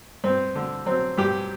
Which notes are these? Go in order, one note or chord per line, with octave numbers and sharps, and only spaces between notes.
G2 C4
D3
F#3 C4
G2 G4